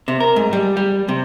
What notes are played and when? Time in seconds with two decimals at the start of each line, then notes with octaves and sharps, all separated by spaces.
0.08 C3
0.20 A#4
0.36 G#2
0.53 G3
0.77 G3
1.09 C3